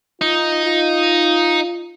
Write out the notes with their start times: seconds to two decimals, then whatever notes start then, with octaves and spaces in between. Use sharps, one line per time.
0.22 D#4 F4
0.65 F4